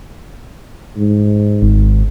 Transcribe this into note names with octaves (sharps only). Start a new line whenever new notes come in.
G#2
G#1